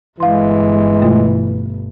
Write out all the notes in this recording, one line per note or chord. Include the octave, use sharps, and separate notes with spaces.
G1 E3 G#3 F5 C6
B2 A3 F4